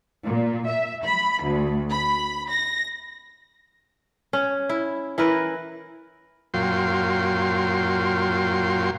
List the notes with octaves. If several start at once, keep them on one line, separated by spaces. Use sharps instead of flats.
A#2
E5
B5
D2
B5
A#6
C#4
E4
E3 E4 A#4 B4
F#2 A#2 F#3 F4 G5 C6